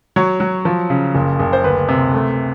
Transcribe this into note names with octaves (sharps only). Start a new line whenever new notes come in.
F#3 C#5
F#3
F3
C#3
F#1
F#1
C5
D2 B4
C3
A3